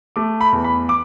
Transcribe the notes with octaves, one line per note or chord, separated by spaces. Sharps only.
A3 D6
B5
E2
B5
D6